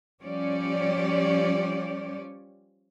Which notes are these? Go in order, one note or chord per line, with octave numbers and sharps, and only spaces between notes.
F3 G3 C#4 G4 C#5 D5